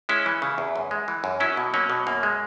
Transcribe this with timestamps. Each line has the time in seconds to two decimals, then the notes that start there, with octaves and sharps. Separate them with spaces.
0.09 G#3 C#4 E4
0.26 E3
0.42 C#3
0.58 E2
0.76 F#2
0.91 G#3
1.08 E3
1.24 F#2
1.40 F#3 C#4 E4
1.57 B2
1.74 F#3 A#3 C#4
1.90 B2
2.07 F#2 A#3
2.23 G#3